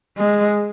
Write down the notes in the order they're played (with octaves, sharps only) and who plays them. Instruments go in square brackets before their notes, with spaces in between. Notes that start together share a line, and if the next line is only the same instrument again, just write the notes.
[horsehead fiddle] G#3